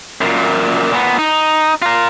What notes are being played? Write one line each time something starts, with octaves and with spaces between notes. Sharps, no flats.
F#2 A#2
A#2 B3
D#4
F4 A#4